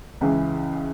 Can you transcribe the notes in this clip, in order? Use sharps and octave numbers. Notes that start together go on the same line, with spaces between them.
C#2 C#3 E3